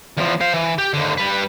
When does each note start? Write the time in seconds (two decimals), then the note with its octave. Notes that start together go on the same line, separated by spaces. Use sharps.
0.17 E2 F3
0.41 C5 F5
0.54 E3
0.78 G4
0.94 D#2 D3
1.18 G3 B4